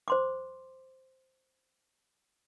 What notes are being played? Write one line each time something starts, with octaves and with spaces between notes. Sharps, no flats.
C5 C6 D6